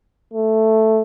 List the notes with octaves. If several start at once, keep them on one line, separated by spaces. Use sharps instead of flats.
A3